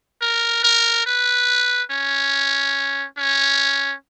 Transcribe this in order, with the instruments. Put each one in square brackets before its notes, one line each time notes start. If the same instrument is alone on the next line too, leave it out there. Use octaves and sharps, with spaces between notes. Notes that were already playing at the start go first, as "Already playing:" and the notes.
[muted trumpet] A#4
A#4
B4
C#4
C#4